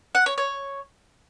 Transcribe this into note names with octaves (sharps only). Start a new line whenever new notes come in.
F#5
C#5
C#5